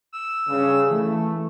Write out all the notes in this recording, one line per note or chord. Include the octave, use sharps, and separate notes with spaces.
E6
G2 C#3
E3 A3